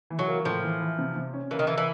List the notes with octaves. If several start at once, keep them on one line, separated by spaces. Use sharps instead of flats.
E3
F#3
A#3
A2 F3
E3
E3
C3
C3
C#4
E3 A#3
D#3
E3 A#3
E3